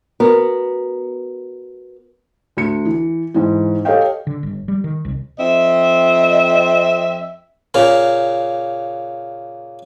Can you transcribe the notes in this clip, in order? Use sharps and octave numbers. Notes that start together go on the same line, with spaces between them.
B3 F#4 A#4
D2 C#7
E3
G#2 E3
G4 A4 C#5 D#5 F5 G5
D3
G1
G3
D#3
C2
F2 C4 D#5 E5
A#2 C#3 A#3